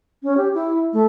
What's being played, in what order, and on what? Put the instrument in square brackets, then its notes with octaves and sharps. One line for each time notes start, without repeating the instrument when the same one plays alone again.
[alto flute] C#4
G4
E4
A3